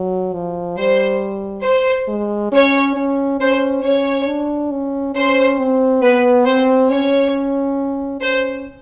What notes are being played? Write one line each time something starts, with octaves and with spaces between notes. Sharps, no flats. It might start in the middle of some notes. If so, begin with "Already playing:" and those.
Already playing: F#3
F3
G3 C5
C5
G#3
C#4 C#5
C#4
C#4 C5
C#4 C#5
D4
C#4
C#4 C5
C4
B3 B4
C4 C5
C#4 C#5
C#4 C5